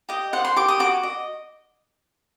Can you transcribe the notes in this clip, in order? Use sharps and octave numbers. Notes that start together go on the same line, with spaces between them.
G4 D#5
C5 F#5
C6
G4 D6
D#6
F#4 D6
D#5